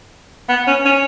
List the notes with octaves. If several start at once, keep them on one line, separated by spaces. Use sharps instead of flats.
B3
C#4
C#4